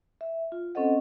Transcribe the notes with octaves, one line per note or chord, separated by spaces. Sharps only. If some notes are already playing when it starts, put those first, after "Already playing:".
E5
F4
C4 C#4 A4 C5 D#5 F#5